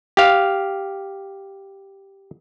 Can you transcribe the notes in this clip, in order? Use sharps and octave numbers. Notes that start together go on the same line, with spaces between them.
G4 F5